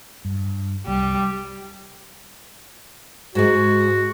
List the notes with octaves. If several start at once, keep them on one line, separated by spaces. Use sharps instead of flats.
G2
C2 G3
G#2 G#3 F#4